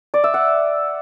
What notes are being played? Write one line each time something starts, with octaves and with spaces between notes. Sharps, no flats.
D5
E5
F#5